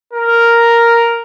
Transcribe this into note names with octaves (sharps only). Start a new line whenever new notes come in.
A#4